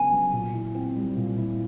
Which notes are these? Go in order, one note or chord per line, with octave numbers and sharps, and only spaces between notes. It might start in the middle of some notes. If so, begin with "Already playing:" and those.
Already playing: C#3 F#3 B3 D4 G#5
F#3
A#2
E4
C4
G3
A#2
E4